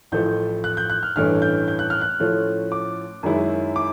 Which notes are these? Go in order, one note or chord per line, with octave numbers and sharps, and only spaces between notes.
A1 A2 F3 A3 G6
F#6
G6
F#6
F6
A1 G2 E3 A3 C#4 F6
G6
G6
F#6
F6
F#6
A2 F3 A3 C#4
D6
F#2 D#3 G#3 C#4 E4
D6